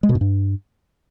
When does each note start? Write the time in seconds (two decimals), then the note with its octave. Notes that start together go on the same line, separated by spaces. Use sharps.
0.03 G#3
0.09 B2
0.15 G#2
0.21 G2